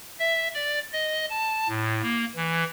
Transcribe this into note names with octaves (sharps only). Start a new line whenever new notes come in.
E5
D5
D#5
A5
A2
A#3
E3